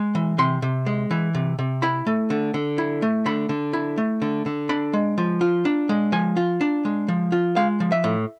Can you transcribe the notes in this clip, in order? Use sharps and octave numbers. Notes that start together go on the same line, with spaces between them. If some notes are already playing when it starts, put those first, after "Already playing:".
Already playing: G#3
E3
C3 C6
C3
G#3
E3
C3
C3
E4 B5
A3
D3
D3
E4
A3
D3 B5
D3
E4
A3
D3
D3
D4 B5
G#3
F3
F4
D4
G#3
F3 G#5
F4
D4
G#3
F3
F4
G#3 F5
F3
E5
A2